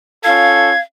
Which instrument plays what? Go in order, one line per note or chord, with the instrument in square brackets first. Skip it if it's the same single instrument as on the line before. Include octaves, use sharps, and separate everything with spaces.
[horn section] C#4 F4 A4 [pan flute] F5 [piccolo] G#6